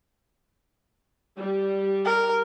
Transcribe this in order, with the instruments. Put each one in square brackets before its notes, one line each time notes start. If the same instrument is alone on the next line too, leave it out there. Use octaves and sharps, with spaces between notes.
[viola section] G3
[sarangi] A#4